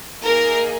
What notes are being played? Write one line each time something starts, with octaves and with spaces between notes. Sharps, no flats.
A#3 D#4 G#4 A#4